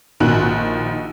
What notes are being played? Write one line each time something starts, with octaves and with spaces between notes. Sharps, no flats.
A#1 D#3 F#4 F#6